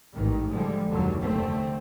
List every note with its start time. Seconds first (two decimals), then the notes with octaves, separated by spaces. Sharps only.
0.14 A1 G#2 D#3
0.50 D3 F3 G3 G#3
0.89 F#1 D#2 B2 D3 F#3
1.22 F1 D3 A3 C4